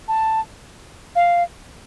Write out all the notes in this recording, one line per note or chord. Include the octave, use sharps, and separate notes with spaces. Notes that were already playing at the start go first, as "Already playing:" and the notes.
A5
F5